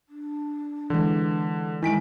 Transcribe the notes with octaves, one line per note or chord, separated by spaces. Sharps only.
D4
D3 E3 G#3
D#3 G#3 E4 G#5 B6 D7